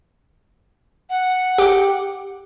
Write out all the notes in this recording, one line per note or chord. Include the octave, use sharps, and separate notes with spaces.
F#5
G4 G5 D6